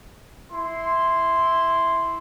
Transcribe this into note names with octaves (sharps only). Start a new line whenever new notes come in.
E4 C6